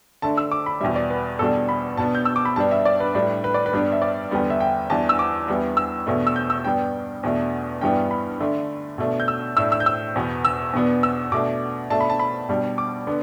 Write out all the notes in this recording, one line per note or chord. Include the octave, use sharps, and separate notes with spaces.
D3 A3 D4 A5
E6
D6
B5
E2 B2 G3 E5
D5
B4
E2 B2 G3 D4 A4
B5
B2 B3 D4 A5
G6
E6
D6
B5
G2 G3 B3 D4 A5
E5
D5
B4
A2 G3 D4 B4
B4
D5
B4
G2 G3 B3 D4
E5
D5
E2 D3 G3 B3
E5
G5
E2 E3 G3 D4 A5
E6
D6
E2 E3 G3 B3 D4
E6
E2 B2 A3 D4
E6
G6
E6
G2 G3 B3 D4 G5
E2 B2 A3 D4
G2 E3 G3 B3 D4 G5
B5
D3 A3 D4
B2 A3 D4
G6
E6
A2 A3 D4 E6
E6
G6
E6
E2 B2 B3
E6
E2 B2 B3 D4
E6
B2 A3 D4 D6
B2 A3 D4 A5
B5
A5
B5
B2 G3 D4
D6
D3 B3 D4